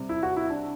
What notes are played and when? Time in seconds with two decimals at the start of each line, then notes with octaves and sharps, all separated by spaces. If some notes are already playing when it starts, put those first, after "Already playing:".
Already playing: C3 G3
0.09 E4
0.23 F#4
0.37 E4
0.50 D4